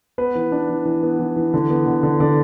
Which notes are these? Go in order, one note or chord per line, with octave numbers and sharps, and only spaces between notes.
B3 B4
E3
D4
E3
E3
B3
E3
E3
D3
B3
D3
D3
D3 D5